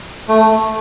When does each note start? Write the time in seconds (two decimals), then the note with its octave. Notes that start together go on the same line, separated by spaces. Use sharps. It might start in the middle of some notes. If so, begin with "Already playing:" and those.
0.29 A3